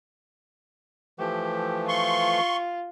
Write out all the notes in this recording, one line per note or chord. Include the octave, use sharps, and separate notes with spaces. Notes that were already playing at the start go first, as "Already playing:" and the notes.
E3 F3 A3 G4
F4 C6 C#6